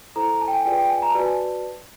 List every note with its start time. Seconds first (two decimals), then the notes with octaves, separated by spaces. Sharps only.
0.16 E4 A4 C5 A#5
0.29 A#5
0.41 A5
0.48 G5
0.53 G#5
0.65 F4 G#4 B4 D5 G5
0.78 G5
0.90 G#5
1.02 A#5
1.10 A5
1.14 F#4 B4 D5 G#5
1.26 A5